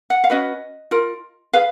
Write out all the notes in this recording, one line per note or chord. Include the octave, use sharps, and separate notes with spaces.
F#5
F5
C#4 F#4 B4 D#5
F4 A#4
G#4 B4 F5